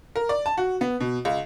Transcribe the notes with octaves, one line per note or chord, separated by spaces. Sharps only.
A#4
D5
A5
F#4
B3
B2
C#2